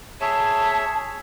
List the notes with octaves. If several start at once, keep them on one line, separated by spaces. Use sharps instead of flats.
G#4 C#5 E5 A5